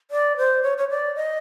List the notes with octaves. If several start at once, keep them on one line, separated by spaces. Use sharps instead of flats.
D5
C5
C#5
C#5
D5
D#5